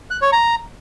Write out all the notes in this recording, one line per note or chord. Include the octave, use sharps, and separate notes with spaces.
F#6
C#5
A#5